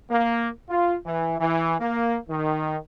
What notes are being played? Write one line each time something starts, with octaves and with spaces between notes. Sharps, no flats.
A#3
F4
E3
E3
A#3
D#3